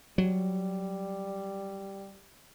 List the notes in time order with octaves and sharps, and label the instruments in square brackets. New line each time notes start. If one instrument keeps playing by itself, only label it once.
[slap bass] F#3 [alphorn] G3